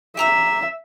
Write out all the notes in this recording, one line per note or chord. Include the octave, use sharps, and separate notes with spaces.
G4 E5 A#5 E6